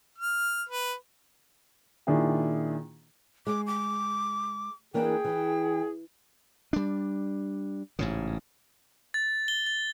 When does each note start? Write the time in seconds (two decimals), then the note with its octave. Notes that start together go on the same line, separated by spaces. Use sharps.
0.18 F6
0.69 B4
2.07 A#2 D#3 D4 E4 G#4
3.47 G#3 D6
3.67 D6
4.94 E3 A#3 D4 G#4 G5
5.25 E3
6.73 G3 D4
7.99 A1 G#2 C#3
9.14 A6
9.48 G7
9.66 A6